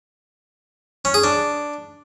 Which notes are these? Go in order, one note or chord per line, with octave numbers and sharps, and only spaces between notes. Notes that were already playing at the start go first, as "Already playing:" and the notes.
C#4
G#4
D4